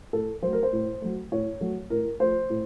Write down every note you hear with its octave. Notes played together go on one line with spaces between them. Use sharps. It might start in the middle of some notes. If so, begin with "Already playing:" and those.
A2 A4
F#3 A3 C5
A#4
C5
A2
F#3 A3
A2 C#5
F#3 A3
A2 A#4
F3 A3 C5
A2